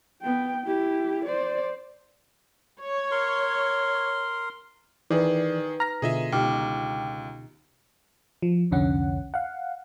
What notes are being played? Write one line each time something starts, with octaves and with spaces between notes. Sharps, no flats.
B3 G5
E4 G4
C5 D5
C#5
A#4 C6
D#3 E3 D#4 G#4 B4 D5
A#5 F6 A#6
B2 D3 F4 G#4 D#5 E5
C#2 B2 D#4 G4 G5 D6 F6
F3
C2 F2 D3 C#4 F#5
F5 F#5